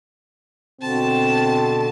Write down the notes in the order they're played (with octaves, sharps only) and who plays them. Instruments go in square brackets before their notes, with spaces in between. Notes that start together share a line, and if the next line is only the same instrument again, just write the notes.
[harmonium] B2 D3 [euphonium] C4 [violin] A5